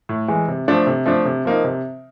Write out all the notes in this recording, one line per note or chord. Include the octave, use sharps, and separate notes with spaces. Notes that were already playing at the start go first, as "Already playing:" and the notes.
A2
E3 G#3
C3
F3 A3 D4
C3
F3 A3 D4
C3
F3 A#3 D#4
C3